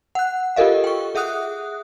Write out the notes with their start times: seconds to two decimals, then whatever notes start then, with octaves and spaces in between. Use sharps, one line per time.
0.15 F#5 F#6
0.56 F4 G4 A4 A#4 D#5 F5
0.84 G5 C#6
1.15 G#4 E5 F#5 D#6 F#6